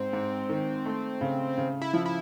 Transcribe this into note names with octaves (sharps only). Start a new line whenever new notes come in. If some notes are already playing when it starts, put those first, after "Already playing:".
Already playing: G#2 C4
G#2
D#3
A3
C#3
C#3
E4
F3
E4